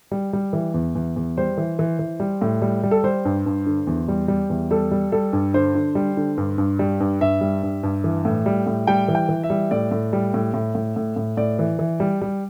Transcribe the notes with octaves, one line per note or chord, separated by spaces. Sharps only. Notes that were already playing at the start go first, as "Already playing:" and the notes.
G3
G3
E3
E2
E2
E2
G3 C5
E3
E3
E3
G3
A2
G3
G3
A4
G3 C5
G2
G2
D3
E2
G3
G3
E2
G3 A4
G3
G3 A4
G2
D3 C5
D3
G3
D3
G2
G2
G3
G2
G2 E5
G3
G2
G2
E3
A2
G3
A2
G3 G5
E3
G5
E3
E5
G3
A2 D5
A2
G3
A2
A2
A2
A2
A2
A2 D5
E3
E3
G3
G3